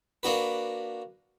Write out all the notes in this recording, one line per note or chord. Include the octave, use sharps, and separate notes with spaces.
A#3 D4 F#4 B4